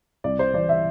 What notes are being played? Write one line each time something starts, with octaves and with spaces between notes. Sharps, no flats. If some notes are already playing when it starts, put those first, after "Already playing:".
C2 D5
C5
C3 E3 D5
E5